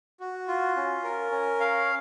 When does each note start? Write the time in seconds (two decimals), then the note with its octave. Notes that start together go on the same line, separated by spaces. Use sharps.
0.20 F#4
0.48 F4
0.77 C#4
1.04 A#4
1.32 C#4
1.60 F5